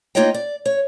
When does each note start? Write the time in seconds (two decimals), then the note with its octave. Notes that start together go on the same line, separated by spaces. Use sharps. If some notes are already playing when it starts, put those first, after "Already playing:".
0.15 A#3 D#4 F4 C#5 D#5 G5
0.34 D5
0.66 C#5